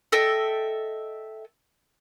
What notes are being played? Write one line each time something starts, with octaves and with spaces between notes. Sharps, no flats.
A4 D#5 E5 G5